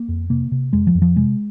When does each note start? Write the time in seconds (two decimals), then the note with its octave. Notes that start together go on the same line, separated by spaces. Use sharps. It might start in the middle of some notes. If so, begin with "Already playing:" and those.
Already playing: A#3
0.08 F2
0.30 C3 A#3
0.52 C3
0.73 F2 G#3
0.87 F3
0.95 F2
1.02 F3
1.16 C3 G#3